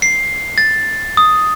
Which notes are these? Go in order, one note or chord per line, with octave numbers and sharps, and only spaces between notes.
C7
A6
D#6